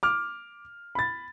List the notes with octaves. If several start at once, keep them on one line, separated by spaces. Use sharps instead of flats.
D6 F6
B5 A6